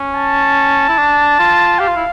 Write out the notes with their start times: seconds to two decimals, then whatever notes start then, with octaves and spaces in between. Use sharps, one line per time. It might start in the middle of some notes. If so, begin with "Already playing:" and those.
Already playing: C#4
0.16 A5
0.88 E4
0.98 D4
1.39 F4
1.79 G4 F5
1.87 F4
1.96 E4